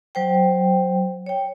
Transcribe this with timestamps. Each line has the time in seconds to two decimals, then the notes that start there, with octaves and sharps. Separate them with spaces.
0.15 F#3 C5 G5
1.26 C#5 G5